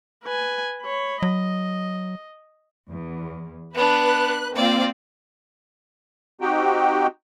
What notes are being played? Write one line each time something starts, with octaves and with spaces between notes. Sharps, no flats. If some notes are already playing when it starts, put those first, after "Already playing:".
B4 G#5
C#5 B5
F#3 D#5
E2
B3 D4 B4 F#6
A#3 C4 F4 D5
C4 D#4 F#4 G4 G5